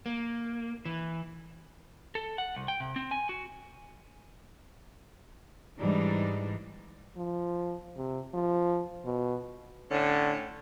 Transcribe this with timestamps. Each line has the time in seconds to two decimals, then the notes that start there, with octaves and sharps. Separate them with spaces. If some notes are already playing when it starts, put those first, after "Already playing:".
0.06 A#3
0.85 E3
2.15 A4
2.38 F#5
2.56 C2
2.68 G5
2.80 C3
2.96 C4
3.11 G#5
3.29 F#4
5.78 G#2 E3 G3 D4 D#4
7.17 F3
7.97 C3
8.34 F3
9.05 B2
9.91 A2 D3 C#4